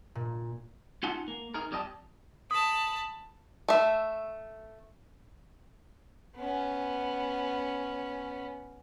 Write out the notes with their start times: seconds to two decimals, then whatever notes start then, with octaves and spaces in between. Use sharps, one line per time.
0.15 A#2
1.03 C#4 D#4 F4 F#5 G#5 A5
1.28 A#3
1.54 D#4 G#4 A#4
1.71 F2 G3 G4 D#5 A5
2.51 A5 B5 D#6
3.68 A3 E5
6.37 B3 C#4